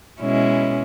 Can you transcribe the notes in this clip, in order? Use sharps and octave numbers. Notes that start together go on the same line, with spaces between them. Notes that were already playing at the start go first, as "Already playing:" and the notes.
B2 G#3 C#4 E4